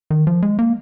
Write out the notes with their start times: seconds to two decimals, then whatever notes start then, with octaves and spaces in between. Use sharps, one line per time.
0.10 D#3
0.27 F3
0.42 G#3
0.59 A#3